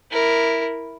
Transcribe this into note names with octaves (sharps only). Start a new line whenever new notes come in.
E4 A#4